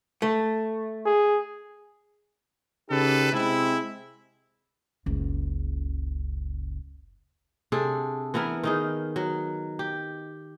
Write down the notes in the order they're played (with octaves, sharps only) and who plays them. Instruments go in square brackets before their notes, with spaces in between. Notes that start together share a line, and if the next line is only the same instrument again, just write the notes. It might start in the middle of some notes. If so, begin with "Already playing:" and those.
[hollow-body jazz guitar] A3
[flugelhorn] G#4
[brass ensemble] C#3 D#4 G4 A4 B4
C3 G#3 C4 E4
[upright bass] F#1 C#2
[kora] C3 D4 G#4 A4
E3 B3 E4 A#4
D#3 D#4 G#4
F#3
G4